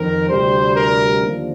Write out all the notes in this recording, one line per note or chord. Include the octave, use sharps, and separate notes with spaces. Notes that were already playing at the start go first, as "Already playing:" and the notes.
Already playing: F2 D#3 A#4
D2 C3 G3 C5
A#4
D#2 D3 F3